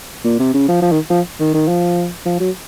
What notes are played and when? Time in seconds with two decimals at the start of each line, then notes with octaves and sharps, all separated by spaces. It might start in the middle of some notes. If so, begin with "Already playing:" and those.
0.24 A#2
0.39 C3
0.54 C#3
0.68 F3
0.82 F3
0.92 D#3
1.10 F3
1.40 D#3
1.54 D#3
1.68 F3
2.25 F3
2.40 F#3